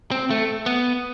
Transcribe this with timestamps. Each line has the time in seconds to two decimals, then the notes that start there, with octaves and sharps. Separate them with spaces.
0.11 C4
0.31 A3
0.66 B3